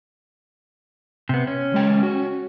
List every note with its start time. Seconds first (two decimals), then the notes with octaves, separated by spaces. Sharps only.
1.29 C3 B3
1.47 C#4
1.72 C#2 G#3 G5
2.03 F#4